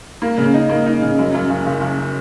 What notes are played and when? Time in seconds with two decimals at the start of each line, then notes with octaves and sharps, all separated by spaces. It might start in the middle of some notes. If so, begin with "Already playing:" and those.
0.22 A#3
0.38 C#3
0.54 D#4
0.69 A#3
0.86 D#4
1.02 C#3
1.19 F#2
1.34 F#2
1.50 F#1
1.66 F#1
1.81 F#1